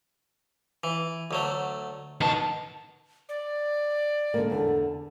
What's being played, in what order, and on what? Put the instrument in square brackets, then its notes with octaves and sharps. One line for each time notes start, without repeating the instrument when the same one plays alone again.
[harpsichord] E3
D2 F#3 A3
[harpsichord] B2 [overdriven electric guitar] D#3 A5
[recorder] D5
[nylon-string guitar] D3 G#3 A#3
E2 D3